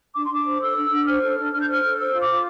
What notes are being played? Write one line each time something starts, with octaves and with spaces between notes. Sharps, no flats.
D4 D6
C6
D4 D6
C5
A4 E6
D4
D4
C5 F6
A4
D4
D4 F6
G6
C5 F6
A4
C5 E6
F4
D6
F4